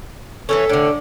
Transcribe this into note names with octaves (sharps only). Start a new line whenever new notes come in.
E3 F3 C#4 A4
A2 D3 D4 D5 D6